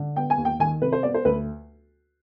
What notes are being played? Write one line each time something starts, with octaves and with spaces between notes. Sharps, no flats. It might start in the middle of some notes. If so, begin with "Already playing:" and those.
Already playing: D3
B3 G5
G#5
D#2
G5
D#3 G#5
C3 B4
C5
B3 D5
C5
D2 B4